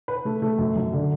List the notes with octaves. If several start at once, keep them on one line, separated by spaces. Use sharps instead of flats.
B4
A3
A3
F#2
F#2
D3